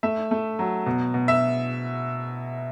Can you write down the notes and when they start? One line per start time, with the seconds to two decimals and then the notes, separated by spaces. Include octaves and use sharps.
0.03 A3 E5
0.31 A3
0.59 F#3
0.86 B2
1.14 B2
1.28 E5